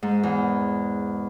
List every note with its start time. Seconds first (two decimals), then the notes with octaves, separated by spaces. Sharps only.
0.03 G#2
0.23 E2